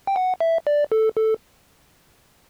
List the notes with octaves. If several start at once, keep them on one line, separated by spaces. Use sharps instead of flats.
G5
F#5
E5
D5
A4
A4